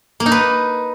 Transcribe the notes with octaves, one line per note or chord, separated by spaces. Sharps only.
A#3
D#4
B4